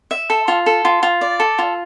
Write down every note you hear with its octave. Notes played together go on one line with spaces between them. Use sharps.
E5
A4
F4
A4
F4
F4
D5
A4
F4